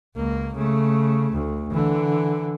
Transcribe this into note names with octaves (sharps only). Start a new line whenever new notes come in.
C#2 A#3
C#3 A3
D2
D3 E3